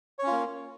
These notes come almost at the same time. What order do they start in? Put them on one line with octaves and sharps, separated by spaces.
C#5 C#4 F4 A#3